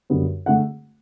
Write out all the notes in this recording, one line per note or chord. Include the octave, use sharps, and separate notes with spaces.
F#2 D3 G3 B3
D3 A3 F#5